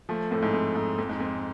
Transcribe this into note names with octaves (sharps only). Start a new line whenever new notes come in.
F3 A3
F2 A2
G#2
F2
G#2
F2
G#2
F2